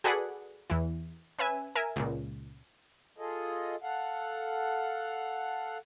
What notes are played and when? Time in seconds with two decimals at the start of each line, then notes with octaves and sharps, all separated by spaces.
0.04 F#4 G#4 A4 B4 D5 F#5
0.70 E2 E3
1.38 C#4 B4 E5 G#5
1.75 A#4 E5 G#5
1.96 C#2 A#2
3.18 F4 G#4 A4 D#5
3.82 A4 F5 F#5